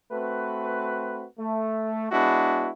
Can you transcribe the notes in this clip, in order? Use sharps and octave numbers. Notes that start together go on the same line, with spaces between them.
A3 C4 F#4 B4
A3
G#3 B3 D4 E4 F#4